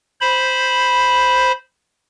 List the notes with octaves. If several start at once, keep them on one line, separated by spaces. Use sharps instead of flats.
C5 B5